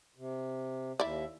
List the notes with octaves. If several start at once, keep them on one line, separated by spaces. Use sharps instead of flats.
C3
D#2 E4 D5 E5